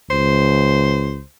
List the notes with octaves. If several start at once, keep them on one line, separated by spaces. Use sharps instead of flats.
C#2 C5